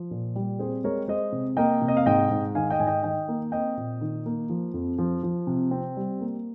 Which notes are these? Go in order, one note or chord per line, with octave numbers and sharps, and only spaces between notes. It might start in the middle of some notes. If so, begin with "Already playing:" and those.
Already playing: F3
A#2
G3
C4 G#4 C5
G#3 A#4 C#5
G#3 C5 D#5
C3
A#3 D#5 G5
C3
D#5
F5
G#2 D#5 G5
G#2
D#3 F5 G#5
D#5 G5
G#2 G#5
D#5 G5
D#3 D#5 G5
A#3
C4 D#5 G5
A#2
D#3
A#3
F3
F2
F3
F3
C3
C4
G3
A#3